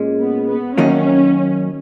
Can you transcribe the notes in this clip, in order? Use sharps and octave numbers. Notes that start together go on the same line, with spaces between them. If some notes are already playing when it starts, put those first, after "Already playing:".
Already playing: A#2 G#3 C#4
B3
B3
F#2 D#3 F#3 A#3 C#4 D#4